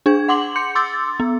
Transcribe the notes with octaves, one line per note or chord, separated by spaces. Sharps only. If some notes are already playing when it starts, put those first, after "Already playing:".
D4 G#4 G#6
F#5 C6 D6 F#7
C6 G6 C#7
C6 D6 E6 A6
B3